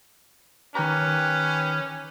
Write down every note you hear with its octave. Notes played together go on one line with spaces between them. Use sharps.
D#3 C#4 G4 B4 A#5